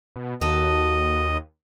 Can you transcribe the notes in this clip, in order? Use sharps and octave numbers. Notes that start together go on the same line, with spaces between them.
B2
D#2 F#4 A4 D#5